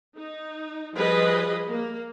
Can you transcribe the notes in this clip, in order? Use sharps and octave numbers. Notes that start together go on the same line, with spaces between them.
D#4
F3 G3 G#4 B4 D#5
A#3